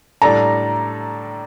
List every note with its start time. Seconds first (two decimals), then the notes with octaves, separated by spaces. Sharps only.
0.22 A2 G3 D4 A4 D5 A#5